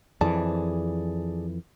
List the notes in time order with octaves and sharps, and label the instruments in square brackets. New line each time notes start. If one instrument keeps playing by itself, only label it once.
[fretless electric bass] F2 E3 [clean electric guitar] G#4 D5 A5